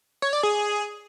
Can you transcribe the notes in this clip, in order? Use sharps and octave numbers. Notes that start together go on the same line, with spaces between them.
C#5
D5
G#4